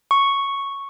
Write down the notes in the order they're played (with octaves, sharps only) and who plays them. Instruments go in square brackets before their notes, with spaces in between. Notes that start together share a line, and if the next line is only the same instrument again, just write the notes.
[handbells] C#6